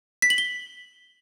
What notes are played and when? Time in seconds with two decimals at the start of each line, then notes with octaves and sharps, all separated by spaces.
0.22 B6
0.30 F#7
0.38 G7